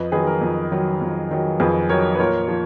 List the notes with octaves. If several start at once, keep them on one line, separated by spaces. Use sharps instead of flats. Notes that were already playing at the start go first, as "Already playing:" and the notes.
Already playing: F2 B4 D#5
D#3 F#3 G#4 B4
A#4
F2
D#3 F#3
F2
D#3 F#3
F2 G#4 B4
D#3 F#3 A#4 C#5
B4
A#2 A#4 C#5
F3